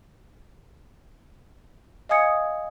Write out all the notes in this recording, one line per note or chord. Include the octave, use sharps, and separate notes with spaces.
D#5 F5 G#5 D#6 G#6 C#7